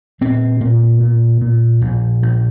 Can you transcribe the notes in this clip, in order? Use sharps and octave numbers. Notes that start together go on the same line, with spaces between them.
A#2 C4
A#2 A#3
A#2
A#2
A#1
A#1